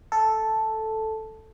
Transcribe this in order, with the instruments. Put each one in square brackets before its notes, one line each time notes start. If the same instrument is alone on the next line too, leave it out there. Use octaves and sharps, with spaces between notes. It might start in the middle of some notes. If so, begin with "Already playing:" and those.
[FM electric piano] A4